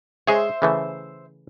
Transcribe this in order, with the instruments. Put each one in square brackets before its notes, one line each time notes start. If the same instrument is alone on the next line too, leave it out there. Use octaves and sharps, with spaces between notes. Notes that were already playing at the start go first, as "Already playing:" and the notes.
[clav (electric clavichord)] G#3 G#4 C#5 [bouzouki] C5 E5
[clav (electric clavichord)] C#3 E3 A3